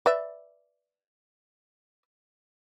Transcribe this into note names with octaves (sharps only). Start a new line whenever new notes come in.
B4 D5 E5